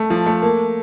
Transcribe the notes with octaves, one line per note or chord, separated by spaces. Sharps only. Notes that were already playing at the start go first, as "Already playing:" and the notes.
Already playing: A3
F3
A3
A#3